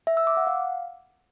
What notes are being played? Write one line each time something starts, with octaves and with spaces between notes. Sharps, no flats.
E5
E6
D6
F#5
F5